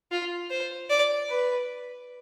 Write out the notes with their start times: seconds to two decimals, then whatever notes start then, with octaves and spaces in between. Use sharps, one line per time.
0.11 F4
0.50 C5
0.89 D5
1.29 B4